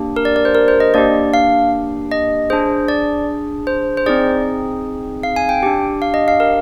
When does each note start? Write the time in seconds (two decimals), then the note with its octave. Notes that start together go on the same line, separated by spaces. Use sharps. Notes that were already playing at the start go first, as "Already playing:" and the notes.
Already playing: A#3 D4 G4
0.16 A#4
0.25 D5
0.36 D5
0.45 C5
0.55 A#4
0.68 C5
0.80 D#5
0.94 A#3 D4 G4 D5
1.34 F5
2.11 D#5
2.50 D4 G#4 C5
2.88 D5
3.67 C5
3.97 C5
4.06 C4 D#4 G#4 D5
5.23 F5
5.36 G#5
5.49 G5
5.63 D4 G4
6.02 F5
6.14 D#5
6.28 F5
6.40 A#4